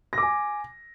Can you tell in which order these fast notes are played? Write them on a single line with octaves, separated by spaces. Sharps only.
A#6 D6 G#5